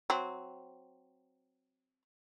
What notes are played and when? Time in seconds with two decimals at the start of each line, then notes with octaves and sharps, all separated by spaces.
0.10 F#3 C4